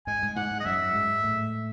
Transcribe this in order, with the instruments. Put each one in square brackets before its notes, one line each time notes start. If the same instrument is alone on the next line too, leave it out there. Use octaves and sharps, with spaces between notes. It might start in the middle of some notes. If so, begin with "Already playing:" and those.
[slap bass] G#2 G#3 [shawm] G#5
[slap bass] G#2 G#3
[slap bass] G#2 G#3 [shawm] F#5
[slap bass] G#2 G#3
[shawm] D#5
[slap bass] F#2 F#3 [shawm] E5
[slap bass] G#2 G#3
A2 A3